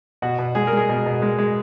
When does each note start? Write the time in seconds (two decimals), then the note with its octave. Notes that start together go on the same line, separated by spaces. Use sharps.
0.22 B2 F#4
0.38 B2
0.55 G#3 G#4
0.67 G#3 A#4
0.77 G#4
0.89 B2
1.06 B2
1.22 G#3
1.38 G#3